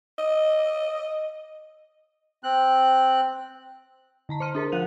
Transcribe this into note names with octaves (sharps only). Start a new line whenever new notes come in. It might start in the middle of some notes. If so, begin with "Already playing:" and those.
D#5
C4 F#6
D3 A5 A#5
C5 A#5 C6 F6 D#7
D4 G#4 A#4 C5
F3 F4 F5 F#6 D#7 F7